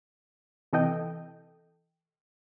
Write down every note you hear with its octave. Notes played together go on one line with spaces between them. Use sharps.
C3 E3 A4 D#5 G5